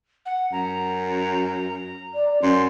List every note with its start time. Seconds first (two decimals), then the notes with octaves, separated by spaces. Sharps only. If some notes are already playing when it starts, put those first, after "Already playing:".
0.26 F#5
0.52 F#2 A#5
2.15 D5
2.42 F#2 C#4 C6